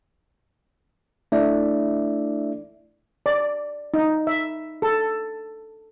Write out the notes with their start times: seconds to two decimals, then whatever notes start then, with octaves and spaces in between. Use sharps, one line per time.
1.32 A3 D4 E4 D5 E5
3.26 D5
3.94 D#4
4.27 E5
4.82 A4